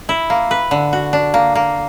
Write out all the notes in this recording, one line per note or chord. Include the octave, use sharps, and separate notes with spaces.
E4
A#3
B4
D3
F#4
D4
A#3
A#3